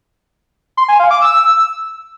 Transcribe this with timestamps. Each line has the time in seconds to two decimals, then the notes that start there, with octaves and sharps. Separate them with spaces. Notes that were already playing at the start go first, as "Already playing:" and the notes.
0.77 C6
0.88 G#5
1.00 F5
1.11 D6
1.22 E6